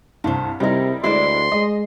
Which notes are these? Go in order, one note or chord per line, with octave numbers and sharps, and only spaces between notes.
C2 G2 A3 C5
C3 G3 G#3 D#4 E4 A#4
D2 G#3 E4 B4 C5 D5 C6
G#3 D#5